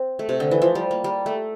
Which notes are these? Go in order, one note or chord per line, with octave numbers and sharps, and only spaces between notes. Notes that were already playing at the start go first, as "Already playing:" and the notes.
Already playing: C4
A3
C3
D3
E3
F3
G3
A#3
G3
A3